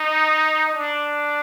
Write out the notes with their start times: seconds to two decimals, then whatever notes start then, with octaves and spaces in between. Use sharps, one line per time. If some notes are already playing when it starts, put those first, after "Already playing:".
Already playing: D#4
0.74 D4